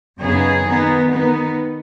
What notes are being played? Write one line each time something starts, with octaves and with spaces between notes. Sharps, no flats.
F#2 C#3 B3 D#4 G#4
D#3 B3 D#4
D#3 B3 D#4